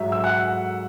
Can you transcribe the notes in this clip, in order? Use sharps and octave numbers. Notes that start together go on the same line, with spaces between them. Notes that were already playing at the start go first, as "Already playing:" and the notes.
Already playing: G#2 F#3 E5
E6
F#5 F#6